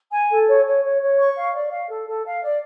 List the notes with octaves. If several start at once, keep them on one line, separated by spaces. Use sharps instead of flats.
G#5
A4
C#5
C#5
C#5
C#5
C#6
F5
D5
F5
A4
A4
F5
D5